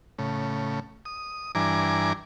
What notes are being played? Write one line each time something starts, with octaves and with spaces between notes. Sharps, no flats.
A2 C#3
D#6
G2 E3 D4 G#5 A#5 D6